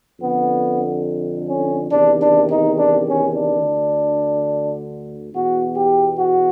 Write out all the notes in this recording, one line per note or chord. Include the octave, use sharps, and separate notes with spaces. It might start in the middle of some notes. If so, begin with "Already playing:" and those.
F2 D3 B3
C#4
E2 C3 D#3 D4
D4
D#4
D4
C#4
D4
D2 D3
E2 B2 F#4
G4
F#4